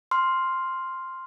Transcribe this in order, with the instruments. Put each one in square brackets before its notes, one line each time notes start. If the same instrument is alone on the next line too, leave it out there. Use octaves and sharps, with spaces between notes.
[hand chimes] C6 F6